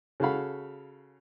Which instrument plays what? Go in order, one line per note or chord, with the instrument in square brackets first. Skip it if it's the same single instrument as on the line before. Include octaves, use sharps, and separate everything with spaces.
[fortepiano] C#3 F#4 A4 F5 B5